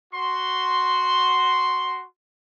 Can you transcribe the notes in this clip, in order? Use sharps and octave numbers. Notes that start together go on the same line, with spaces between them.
F#4 C6